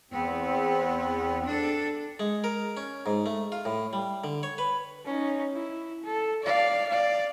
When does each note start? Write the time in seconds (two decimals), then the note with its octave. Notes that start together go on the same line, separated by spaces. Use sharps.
0.11 E2 B3 C4
1.45 D4 A4
2.20 G#3
2.44 A#4
2.77 C#4
3.06 G#2
3.26 A3
3.52 F4
3.65 A2
3.93 G3
4.24 D3
4.43 C#5
4.58 B4
5.05 C#4 D#4
5.53 E4
6.04 A4
6.43 D5 F5
6.89 D5 F5